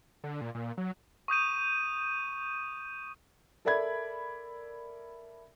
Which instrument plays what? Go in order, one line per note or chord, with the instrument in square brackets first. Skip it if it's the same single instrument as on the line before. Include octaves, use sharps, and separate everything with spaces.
[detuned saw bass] D3
A#2
A#2
F#3
[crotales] C#6 D#6 G6 D#7
[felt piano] A4 A#4 D5 E5 B5 G#6